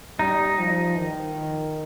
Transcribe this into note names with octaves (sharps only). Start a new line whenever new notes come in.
G3 D#4
F3
D#3